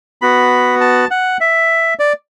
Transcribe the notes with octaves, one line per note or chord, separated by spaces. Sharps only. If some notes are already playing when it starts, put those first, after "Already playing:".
B3 F#4 B5
A5
F#5
E5
D5